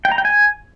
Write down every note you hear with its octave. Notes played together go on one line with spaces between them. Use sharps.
G5
A#5
G5
G#5